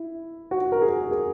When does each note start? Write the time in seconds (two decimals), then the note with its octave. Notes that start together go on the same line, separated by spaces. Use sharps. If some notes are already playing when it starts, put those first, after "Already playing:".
Already playing: E4
0.51 F#4
0.72 A#4
0.82 G#4
1.11 G#4